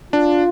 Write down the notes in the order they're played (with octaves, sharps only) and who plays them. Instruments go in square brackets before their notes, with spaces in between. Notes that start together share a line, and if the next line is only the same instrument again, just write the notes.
[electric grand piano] D4 [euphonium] F4